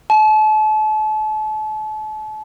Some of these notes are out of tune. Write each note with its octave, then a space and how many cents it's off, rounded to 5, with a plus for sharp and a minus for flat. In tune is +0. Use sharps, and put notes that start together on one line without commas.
A5 -35